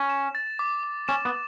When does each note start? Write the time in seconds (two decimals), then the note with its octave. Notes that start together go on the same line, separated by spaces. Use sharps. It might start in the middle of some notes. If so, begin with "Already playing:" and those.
Already playing: C#4
0.09 E7
0.35 A6
0.59 D6
0.83 D6
1.08 C#4 E7
1.25 B3